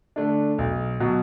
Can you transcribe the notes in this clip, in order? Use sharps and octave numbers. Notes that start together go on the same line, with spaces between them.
D3 A3 D4
B1
B2 F#3